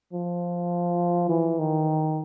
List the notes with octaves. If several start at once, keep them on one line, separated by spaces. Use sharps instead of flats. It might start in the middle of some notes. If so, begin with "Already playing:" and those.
F3
E3
D#3